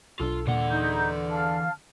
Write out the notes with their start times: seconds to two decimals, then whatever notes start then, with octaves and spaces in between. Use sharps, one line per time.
0.20 B1 D4 F4 A4
0.47 D#1 A#2 D3 E3 F#5
0.70 D#4 A#5 G6
1.31 F5 A5 F6